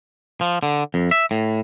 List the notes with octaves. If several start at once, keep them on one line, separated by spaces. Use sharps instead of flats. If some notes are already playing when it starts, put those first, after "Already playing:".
F3
D3
F2
E5
A2